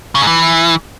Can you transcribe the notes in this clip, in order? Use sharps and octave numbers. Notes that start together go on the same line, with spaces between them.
C#3
G#2
E3